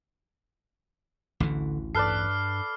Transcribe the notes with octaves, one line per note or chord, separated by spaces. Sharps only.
A1 D2 D3 E3
G2 A4 B4 D5 F6 C7